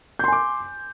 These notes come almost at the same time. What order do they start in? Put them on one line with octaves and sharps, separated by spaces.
G6 C6 G#5 D6